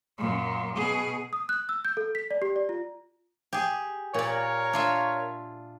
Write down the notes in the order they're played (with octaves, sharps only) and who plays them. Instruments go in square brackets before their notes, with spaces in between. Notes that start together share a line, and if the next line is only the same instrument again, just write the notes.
[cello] F#2 A#2
B2 G#4
[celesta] D#6
F#6
E6
G6
A4
B6
D5
G4
D5
F4
[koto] G4 G#4
[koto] A#2 D5 [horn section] A#4 C#5
[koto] D4 F4 E5